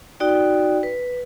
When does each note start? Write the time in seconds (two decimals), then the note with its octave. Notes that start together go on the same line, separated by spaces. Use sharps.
0.20 D#4 F#4 D5 G5
0.83 B4